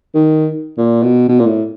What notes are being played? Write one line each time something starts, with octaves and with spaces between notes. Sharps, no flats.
D#3
A#2
B2
B2
A#2
A2